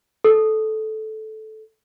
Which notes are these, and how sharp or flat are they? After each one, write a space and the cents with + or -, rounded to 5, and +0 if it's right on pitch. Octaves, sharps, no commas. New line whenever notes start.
A4 -10